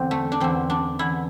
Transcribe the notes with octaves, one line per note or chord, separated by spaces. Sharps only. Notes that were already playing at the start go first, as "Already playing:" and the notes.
Already playing: E2 D3 C4
A3
D4
E2 D3 C4
D4
E2 D3 E4